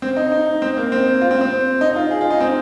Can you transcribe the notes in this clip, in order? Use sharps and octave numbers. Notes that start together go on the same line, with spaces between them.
C4
D#4
D#4
C4
A#3
C4
F4
C4
C4
D#4
F4
G#4
F4
D#4
C4